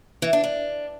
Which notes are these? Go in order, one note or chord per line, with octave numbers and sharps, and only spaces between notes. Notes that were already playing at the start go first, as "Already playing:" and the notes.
E3
D4
D4